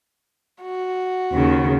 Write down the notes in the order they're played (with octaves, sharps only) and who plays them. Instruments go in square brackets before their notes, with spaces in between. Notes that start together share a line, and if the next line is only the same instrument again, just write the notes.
[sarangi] F#4
[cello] D#2 C#3